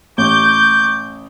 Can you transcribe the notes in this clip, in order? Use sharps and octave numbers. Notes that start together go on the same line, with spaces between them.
A1 C#6 D6 G6